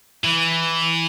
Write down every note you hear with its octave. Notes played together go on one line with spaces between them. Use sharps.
E3